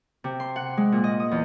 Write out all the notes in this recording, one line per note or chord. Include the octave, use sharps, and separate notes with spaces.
C3
C6
F#5
G#3
A#2
D#5
D#6
E2